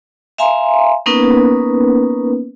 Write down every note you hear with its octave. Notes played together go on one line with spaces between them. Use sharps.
E5 F5 G#5 A#5 C6
A#3 B3 C#4 D#4 A#4 B4